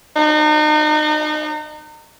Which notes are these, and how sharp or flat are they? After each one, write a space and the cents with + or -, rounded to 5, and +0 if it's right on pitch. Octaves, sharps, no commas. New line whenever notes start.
D#4 -35